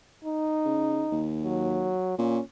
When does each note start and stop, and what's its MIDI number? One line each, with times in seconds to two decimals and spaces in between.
0.25 1.24 63
0.65 1.04 49
1.11 1.94 39
1.44 2.17 54
2.18 2.39 46
2.18 2.41 61